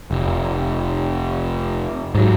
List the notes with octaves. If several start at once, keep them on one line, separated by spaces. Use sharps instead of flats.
F1
G#2 F#3